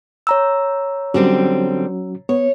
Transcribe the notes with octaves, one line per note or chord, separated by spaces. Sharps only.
C#5 A#5 E6
D3 F#3 G3 C4 C#4 F#4
B3 C#5